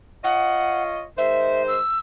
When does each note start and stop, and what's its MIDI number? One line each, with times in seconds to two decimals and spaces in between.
0.24 1.04 65
0.24 1.04 73
0.24 1.04 75
0.24 0.83 78
1.18 1.78 51
1.18 1.78 56
1.18 1.78 72
1.18 1.63 76
1.68 1.99 88